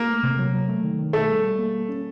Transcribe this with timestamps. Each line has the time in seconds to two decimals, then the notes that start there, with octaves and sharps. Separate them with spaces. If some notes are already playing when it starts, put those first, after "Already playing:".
Already playing: A#3
0.09 A3
0.23 C3
0.39 F#3
0.54 F#3
0.68 A3
0.83 D#3
0.99 D#3
1.13 B2 A3
1.29 G3
1.44 G3
1.59 A#3
1.74 A#3
1.89 C#4